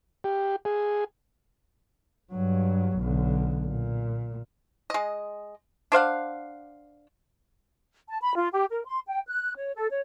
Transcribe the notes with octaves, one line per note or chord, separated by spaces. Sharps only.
G4
G#4
G2 F#3
B1 D3
A#2
G#3 D#5
D4 C5 F5 F#5
A5
B5
F4
G4
A#4
C6
G5
F#6
C#5
A4
C#5